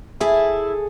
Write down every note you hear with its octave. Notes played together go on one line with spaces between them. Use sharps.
E4 G#4 A4 G#5